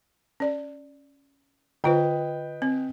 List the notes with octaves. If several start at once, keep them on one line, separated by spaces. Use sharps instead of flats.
C#4 D5
D3 F4 B4 C5 D#5 G5
C4